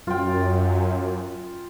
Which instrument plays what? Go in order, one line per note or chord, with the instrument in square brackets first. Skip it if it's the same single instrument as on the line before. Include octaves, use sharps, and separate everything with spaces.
[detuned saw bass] F#2 [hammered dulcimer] F4 G5